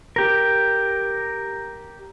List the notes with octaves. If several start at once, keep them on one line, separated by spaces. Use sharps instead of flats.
G4 A#4